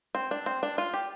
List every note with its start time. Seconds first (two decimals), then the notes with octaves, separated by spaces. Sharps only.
0.15 C4
0.31 D4
0.46 C4
0.63 D4
0.78 F4
0.94 G4